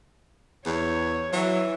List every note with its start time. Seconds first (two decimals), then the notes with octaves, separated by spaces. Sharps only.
0.66 E2 C#5
1.33 E3 F#3